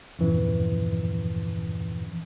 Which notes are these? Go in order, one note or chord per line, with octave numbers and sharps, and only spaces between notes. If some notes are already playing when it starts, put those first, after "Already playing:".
E2 G2 A#2 E3 F3 C#4